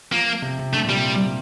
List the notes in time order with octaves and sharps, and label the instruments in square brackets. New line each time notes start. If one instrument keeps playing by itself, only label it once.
[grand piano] F3 [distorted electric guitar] A#3
[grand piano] C3
C3
[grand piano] D3 [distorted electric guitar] A3
[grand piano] A#2
[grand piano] C3 [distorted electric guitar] G3